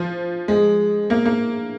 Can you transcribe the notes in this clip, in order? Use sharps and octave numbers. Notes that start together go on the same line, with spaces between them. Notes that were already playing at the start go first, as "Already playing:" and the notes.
Already playing: F3
G#3
A#3
A#3